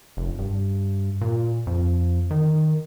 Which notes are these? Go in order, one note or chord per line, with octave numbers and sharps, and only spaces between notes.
F1
G2
A#2
F2
D#3